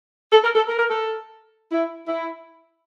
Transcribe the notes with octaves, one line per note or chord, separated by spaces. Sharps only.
A4
A#4
A4
A#4
A#4
A4
E4
E4